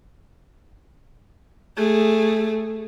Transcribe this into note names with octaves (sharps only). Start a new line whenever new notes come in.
A3 G#4